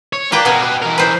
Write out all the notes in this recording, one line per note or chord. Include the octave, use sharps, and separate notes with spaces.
C#5
A#3 D4 B4 G5
B2 F#4 G#4 A#4
G4 B4
E3 A#4
B4 C5